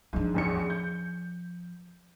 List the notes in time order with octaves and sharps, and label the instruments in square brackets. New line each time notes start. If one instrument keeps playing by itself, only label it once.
[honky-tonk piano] G#2 [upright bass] F3 D4
[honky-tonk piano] A1 E2 C#7
G6